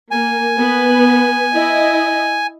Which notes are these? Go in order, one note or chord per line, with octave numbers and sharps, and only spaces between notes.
A#3 G#5
B3 B4
E4 D#5